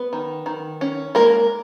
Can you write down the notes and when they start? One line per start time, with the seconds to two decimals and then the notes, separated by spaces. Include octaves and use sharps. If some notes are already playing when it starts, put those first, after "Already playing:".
Already playing: B3 B4
0.13 D#3
0.46 D#3
0.81 C#4
1.15 G#3 A#3 A#4